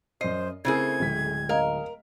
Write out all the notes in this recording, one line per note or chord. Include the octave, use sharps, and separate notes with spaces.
F#2 C5 D#5 C7
C#3 A3 C4 E4 G#4 A#4 G#6
D1 G#3 B6
A#4 D#5 F5